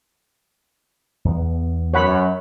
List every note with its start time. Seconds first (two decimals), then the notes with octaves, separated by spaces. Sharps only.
1.25 E2 B3
1.94 F#2 C#5 F#5 B5